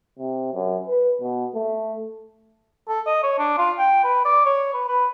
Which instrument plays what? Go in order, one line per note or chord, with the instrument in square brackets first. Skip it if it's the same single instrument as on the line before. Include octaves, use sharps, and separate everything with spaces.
[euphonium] C3
F#2
B4
B2
A3
[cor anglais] A4
D#5
C#5
D4
F4
G5
B4
D5
C#5
B4
B4